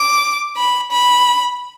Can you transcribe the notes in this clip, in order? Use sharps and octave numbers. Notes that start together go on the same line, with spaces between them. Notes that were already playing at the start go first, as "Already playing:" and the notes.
Already playing: D6
B5
B5